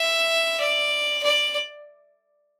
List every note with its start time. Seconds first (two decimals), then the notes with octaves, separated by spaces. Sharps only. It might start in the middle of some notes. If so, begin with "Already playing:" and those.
Already playing: E5
0.60 D5
1.23 D5